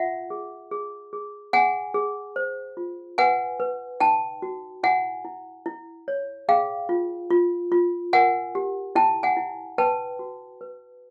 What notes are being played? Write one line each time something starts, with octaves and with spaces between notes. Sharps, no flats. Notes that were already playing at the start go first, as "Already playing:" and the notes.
Already playing: F4 E5 F#5
G#4
G#4
G#4
G#4 F#5 G#5
G#4
C5
F4
B4 F#5 G#5
B4
D#4 G5 A5
F#4
E4 F#5 G#5
E4
E4
C#5
G#4 F5 G5
F4
F4
F4
A#4 F#5 G#5
G4
E4 G5 A5
F#5 G#5
E4
B4 G5 A5
F#4
B4